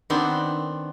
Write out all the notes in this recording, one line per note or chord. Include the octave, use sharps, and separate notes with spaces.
D#3 B3 C4 D4